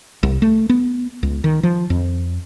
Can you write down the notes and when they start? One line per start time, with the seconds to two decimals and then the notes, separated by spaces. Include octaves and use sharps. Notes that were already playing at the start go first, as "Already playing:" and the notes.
0.23 C2
0.42 A3
0.69 B3
1.23 C#2
1.44 D#3
1.63 F3
1.90 F2